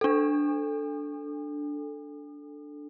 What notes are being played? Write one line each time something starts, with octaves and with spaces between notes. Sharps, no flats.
D4 A4